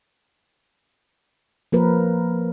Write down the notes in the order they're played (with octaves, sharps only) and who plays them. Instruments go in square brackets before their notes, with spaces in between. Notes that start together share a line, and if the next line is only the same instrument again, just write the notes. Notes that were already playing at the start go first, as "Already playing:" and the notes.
[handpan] F3 A#3 A#4 B4